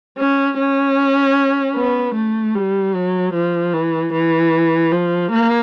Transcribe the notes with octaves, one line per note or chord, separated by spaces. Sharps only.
C#4
C#4
B3
A3
G3
F#3
F3
E3
E3
F3
A#3